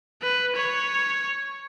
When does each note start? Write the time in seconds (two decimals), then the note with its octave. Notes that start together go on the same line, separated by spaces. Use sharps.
0.22 B4
0.56 C#5